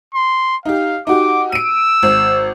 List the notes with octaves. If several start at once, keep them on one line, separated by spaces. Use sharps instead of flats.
C6
D#4 G4 F5
D#4 F#4 G4 D6
E6 D7 D#7
G#1